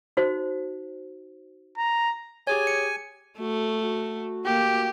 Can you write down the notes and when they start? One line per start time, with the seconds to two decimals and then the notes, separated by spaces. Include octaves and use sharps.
0.17 D#4 F#4 C5
1.78 A#5
2.47 G4 G#4 C#5 G#5
2.67 C#7
3.39 A3 F#4
3.82 F#4
4.45 A#3 G4